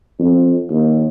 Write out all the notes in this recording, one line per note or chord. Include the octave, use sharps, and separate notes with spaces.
F2
D#2